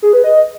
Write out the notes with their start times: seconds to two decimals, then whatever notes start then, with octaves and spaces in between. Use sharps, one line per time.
0.02 G#4
0.13 B4
0.24 D#5